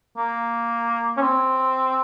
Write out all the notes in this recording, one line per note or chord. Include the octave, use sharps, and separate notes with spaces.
A#3
C#4
C4